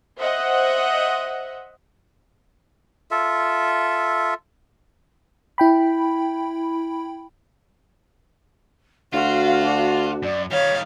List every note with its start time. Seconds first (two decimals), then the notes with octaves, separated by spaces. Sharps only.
0.19 C5 D#5 E5 F#5
3.11 F4 A4 E5
5.58 E4 G5 B5
9.14 D2 F4 F#4 F5
9.63 D4
10.23 F#2 D5
10.51 D#3 G3 C#5 F5